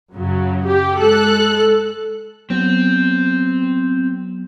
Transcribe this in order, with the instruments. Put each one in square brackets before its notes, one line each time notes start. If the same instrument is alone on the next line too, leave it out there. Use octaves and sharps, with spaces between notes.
[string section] F#2 C#3 F#3
G4
G#3 A4 F#6
[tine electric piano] F#3 B3 [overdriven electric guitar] C4